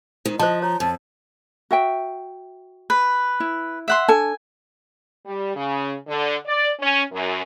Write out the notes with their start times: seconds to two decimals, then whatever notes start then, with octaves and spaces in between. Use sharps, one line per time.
0.25 G#2 D#3
0.39 F3 C5 D#5 A5
0.62 C#5 A#5
0.80 F2 A5
1.71 F#4 E5 G5
2.90 B4
3.40 E4
3.88 E5 F#5 C6
4.08 D4 A4 G#5 A5
5.25 G3
5.56 C#3
6.07 D3
6.46 D5
6.80 C#4
7.12 F#2